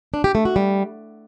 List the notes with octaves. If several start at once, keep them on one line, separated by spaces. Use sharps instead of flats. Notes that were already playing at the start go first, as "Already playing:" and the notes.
D4
G4
A3
F#4
G3